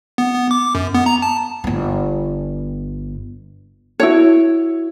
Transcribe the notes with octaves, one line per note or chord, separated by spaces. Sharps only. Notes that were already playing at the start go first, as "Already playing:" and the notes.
B3
B3
D6
F#2
B3
A#5
A5
G1 B3
E4 F#4 C#5